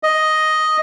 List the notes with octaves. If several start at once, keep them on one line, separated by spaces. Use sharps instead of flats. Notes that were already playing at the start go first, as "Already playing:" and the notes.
D#5